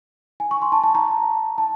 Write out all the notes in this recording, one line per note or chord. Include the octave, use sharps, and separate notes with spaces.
G#5
C#6
C6
A5
A5
A#5
A5